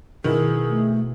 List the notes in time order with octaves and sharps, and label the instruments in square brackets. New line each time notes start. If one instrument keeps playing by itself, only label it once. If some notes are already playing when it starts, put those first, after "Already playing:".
[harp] B2 E4 E7 [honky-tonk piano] D#3 [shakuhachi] G#4
[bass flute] A3